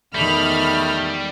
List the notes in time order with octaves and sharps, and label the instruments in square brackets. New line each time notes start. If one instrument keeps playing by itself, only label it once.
[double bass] E2 D#3 [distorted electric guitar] G3 [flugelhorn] A3 [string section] B5 F6